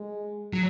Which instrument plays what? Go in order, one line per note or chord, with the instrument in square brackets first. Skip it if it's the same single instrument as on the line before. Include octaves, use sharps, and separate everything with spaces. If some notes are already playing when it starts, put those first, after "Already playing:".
Already playing: [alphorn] G#3
[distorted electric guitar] F#3